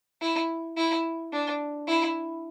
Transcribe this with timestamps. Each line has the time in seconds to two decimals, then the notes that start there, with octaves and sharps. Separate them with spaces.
0.21 E4
0.77 E4
1.33 D4
1.88 E4